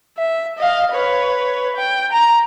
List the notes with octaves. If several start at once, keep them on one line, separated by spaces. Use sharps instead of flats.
E5
D#5 F5
B4 C#5
G5
A#5